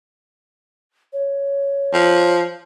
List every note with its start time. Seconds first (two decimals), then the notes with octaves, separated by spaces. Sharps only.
1.13 C#5
1.94 F3